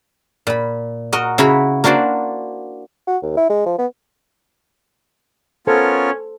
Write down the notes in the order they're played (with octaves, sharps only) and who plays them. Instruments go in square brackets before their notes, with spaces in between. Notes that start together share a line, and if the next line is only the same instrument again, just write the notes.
[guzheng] A#2 B5
F#4 A#4 D#5
C#3 E4 F#4 A#5 B5
A#3 D4 F#4 C5 D5
[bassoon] F#4
D#2
E4
G#3
F3
B3
[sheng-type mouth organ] B3 F4 A#4 [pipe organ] C#4 C#5 [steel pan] A4 C5